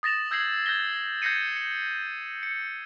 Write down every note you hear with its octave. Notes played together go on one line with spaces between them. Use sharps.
D#6 A6 A#6 E7 F7
E6 G6 G#6 A#6 C7 F#7
G6 G#6 A#6 G7
G6 G#6 A#6 C7 C#7 D#7
C#7
C#7